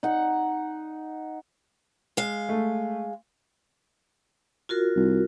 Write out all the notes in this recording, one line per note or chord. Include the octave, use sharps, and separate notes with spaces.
D#4 F#5
G#3 F5
A3
F4 F#4 A#4
C2